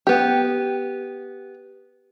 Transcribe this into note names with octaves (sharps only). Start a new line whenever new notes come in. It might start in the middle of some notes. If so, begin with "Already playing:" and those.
B3 G4